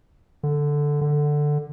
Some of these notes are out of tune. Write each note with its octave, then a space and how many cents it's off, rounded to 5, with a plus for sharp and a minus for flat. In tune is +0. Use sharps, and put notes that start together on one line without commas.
D3 +0
D3 +10